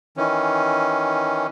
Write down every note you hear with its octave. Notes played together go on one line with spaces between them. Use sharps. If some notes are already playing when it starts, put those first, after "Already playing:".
D#3 E3 C#4